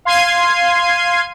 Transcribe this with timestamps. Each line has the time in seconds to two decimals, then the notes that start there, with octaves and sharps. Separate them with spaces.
0.05 F5 C6 G#6 C7 D#7